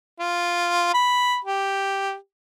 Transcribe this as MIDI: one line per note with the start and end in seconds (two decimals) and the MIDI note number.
0.20 0.91 65
0.94 1.37 83
1.44 2.15 67